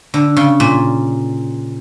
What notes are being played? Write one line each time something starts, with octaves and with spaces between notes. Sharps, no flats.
D3
C#3
A#2